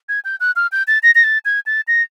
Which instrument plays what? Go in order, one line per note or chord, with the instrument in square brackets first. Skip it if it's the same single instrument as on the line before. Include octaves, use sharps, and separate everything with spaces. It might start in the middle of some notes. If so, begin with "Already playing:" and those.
[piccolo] G#6
G6
F#6
F6
G6
A6
A#6
A#6
A6
G#6
A6
A#6